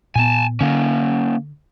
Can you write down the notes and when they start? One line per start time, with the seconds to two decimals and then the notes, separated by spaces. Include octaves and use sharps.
0.16 A#2 B3 G#5 A5
0.61 D3 A#3 C#4